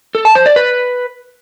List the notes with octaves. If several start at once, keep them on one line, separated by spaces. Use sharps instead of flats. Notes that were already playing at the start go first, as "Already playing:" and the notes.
A4
A5
C5
D5
B4